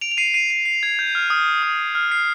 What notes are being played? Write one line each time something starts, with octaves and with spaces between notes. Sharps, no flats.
D7 F7
F7
C7 D#7
C7 D#7
C7
C7
G#6
G6
F6
D#6
D#6
F6
C7